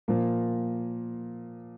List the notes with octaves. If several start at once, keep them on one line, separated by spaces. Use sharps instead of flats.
A#2 F3 A#3